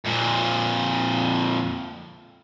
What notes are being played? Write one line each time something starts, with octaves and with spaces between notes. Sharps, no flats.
F2 A#2